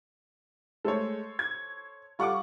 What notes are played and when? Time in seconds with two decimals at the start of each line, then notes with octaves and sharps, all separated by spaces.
0.85 G#3 A3 A4 C5 C#5
1.39 G#6
2.19 G3 F4 A4 F#5 C#6 D6